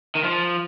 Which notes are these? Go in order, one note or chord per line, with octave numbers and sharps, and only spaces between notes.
D#3
F3